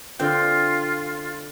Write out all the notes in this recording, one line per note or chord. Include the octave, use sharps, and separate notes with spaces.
D3 C4 F4 G5